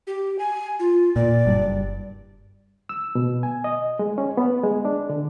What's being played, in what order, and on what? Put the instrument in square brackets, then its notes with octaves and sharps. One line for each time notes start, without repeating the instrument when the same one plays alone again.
[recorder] G4
G#5
F4
[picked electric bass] A#2 [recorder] D5
[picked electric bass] F#1 G2
[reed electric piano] E6
B2
G#5
D#5
G#3
C#4
B3
G#3
D4
D3